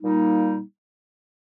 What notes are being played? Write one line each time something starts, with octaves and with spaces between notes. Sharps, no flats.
A#2 G3 A#3 D#4